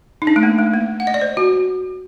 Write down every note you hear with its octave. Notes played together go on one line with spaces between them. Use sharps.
D#4
D4
A3
A#3
A3
A#3
F#5
D#5
D5
C5
F#4